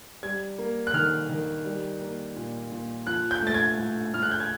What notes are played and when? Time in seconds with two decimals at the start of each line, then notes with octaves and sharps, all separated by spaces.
0.23 G3 G#6
0.58 A#3
0.87 F#6
0.94 D#3 F6
1.29 D#3
1.65 G3
2.01 A#3
2.36 A#2
2.72 A#2
3.07 F3 F#6
3.31 G6
3.42 A3 A6
3.54 G#6
3.78 A2
4.13 A2 F6
4.22 F#6
4.31 G6
4.40 G#6